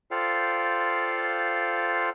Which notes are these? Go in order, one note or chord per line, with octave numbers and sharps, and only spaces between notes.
F4 A4 C5 D5 F5 G5